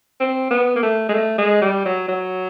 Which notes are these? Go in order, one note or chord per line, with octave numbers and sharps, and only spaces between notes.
C4
B3
A#3
A3
G#3
A3
G#3
G3
F#3
F#3